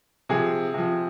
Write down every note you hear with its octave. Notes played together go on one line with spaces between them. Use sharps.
C3 F3 G#4
C3 F3